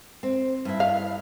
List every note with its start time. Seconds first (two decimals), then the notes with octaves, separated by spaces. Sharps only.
0.23 C4
0.65 G2 E4
0.80 F5